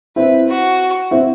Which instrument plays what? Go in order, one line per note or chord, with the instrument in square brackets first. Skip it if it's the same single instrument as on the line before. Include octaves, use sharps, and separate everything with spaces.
[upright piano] C4 E4 [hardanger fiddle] B4
[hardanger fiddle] F#4
[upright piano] C4 E4